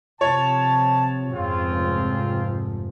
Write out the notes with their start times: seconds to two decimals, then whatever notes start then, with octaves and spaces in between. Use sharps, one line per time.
0.21 C3 F3 C#5 A5
1.33 F1 G#2 C#3 F3 C4 F4